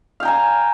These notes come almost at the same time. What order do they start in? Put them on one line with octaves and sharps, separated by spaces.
F5 G5 A#5 G#5